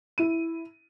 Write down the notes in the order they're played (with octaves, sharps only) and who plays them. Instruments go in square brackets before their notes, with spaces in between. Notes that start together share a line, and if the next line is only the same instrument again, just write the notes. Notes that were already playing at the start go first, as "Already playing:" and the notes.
[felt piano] E4 D#7